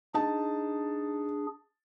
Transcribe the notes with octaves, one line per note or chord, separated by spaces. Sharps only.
D4 D#4 G#4 A5